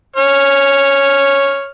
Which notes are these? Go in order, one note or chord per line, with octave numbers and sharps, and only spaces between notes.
C#5 F6